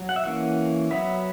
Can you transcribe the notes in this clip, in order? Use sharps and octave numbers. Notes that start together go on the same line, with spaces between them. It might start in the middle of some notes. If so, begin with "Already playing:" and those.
Already playing: F#3
F#5
E5
E3 A#3 C#4 F#5
F#3 B3 E5